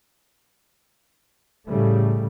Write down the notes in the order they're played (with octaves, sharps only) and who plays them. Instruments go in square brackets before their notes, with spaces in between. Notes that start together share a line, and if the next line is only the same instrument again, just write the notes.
[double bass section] A2 C#3 G3 A3